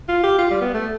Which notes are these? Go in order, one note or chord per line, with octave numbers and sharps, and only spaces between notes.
F4
G4
F4
G3
B3
A3